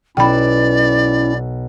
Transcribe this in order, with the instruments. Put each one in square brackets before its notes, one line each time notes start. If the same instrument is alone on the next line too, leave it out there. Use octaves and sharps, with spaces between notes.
[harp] B1 E7 [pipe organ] C#4 E4 [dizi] D5 [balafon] G5 B5